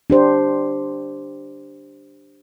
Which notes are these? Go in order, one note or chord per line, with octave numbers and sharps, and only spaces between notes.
D4 G4 C5